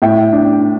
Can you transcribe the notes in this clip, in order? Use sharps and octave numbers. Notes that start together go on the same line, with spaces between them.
A2 E5 G5
D4